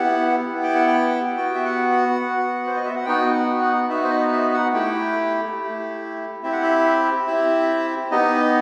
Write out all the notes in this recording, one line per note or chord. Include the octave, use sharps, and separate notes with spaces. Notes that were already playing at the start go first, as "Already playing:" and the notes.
Already playing: B3 E4 G4 F#5
B3 E4 G4
G5
F#5
G5
B3 F#4 G5
E5
F#5
F#5
B3 F#4
C5
D#5
E5
F#5
B3 D#4 F#4 G5
F#5
F#5
B3 D#4 F#4 E5
C5
D#5
E5
F#5
A3 E4 G4 G5
A3 E4 G4
C4 E4 G4 E5
F#5
E5
C4 E4 G4 E5
B3 D#4 G4 D#5